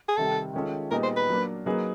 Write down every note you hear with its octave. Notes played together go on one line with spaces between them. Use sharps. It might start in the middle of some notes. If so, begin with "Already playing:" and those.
G#4
C3 D#3 G3 A4
D#3 G#3 C#4 F4 A4
A#2 G3 B3 D#4 G#4 A#4
C5
B4
F#3 A#3 D4
F#3 A#3 D#4 G#4 B4